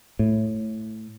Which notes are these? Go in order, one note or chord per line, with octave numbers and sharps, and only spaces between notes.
A2